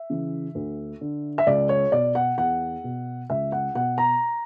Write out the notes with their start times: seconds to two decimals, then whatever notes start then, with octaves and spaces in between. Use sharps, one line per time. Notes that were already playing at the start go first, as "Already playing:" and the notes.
Already playing: E5
0.10 C#3 E3
0.55 D2
1.01 D3
1.38 E5
1.47 C#2 D5
1.69 C#5
1.92 B2 D5
2.15 F#5
2.38 E2 F#5
2.84 B2
3.30 C#2 E5
3.52 F#5
3.75 B2 F#5
3.98 A#5